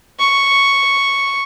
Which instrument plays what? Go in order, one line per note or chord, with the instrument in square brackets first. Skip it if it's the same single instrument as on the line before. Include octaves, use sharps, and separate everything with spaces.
[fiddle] C#6